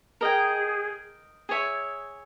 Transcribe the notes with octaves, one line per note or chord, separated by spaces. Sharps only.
G#4 A#4 D#5 G5
G#4 C#5 E5